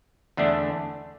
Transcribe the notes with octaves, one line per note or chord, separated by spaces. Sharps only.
E2 D3 A3 D4